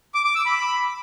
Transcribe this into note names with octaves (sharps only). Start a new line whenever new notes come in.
D6
D6
E6
B5